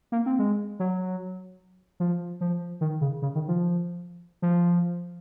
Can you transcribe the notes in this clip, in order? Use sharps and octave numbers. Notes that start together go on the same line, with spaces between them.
A#3
C4
G#3
F#3
F3
F3
D#3
C#3
C#3
D#3
F3
F3